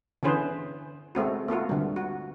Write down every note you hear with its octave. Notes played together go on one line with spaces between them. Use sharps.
D3 E3 C#4 G#4 B4 C5
G#3 A3 C4 F#4
A3 A#3 F4 F#4
D3 G3
F#4